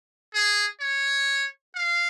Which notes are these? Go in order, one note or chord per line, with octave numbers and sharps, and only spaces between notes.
G#4
C#5
F5